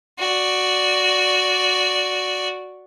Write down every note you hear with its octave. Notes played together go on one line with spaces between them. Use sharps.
F#4 D5